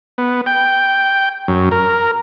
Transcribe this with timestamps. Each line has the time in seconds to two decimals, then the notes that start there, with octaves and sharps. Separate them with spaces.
0.18 B3
0.46 G5
1.48 F#2
1.71 A#4